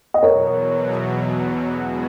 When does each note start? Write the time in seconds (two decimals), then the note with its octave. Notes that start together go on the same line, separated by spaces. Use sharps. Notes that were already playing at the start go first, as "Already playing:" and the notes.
0.14 D#5
0.23 E2 B2 F#3 A#4 C#5
1.73 C#3 G#3 B3 F#4